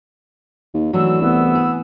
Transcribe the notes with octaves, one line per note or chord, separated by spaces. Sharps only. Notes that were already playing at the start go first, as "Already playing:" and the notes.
D#2
E3 F#3 A3 D4 E6
C2 B3
G#4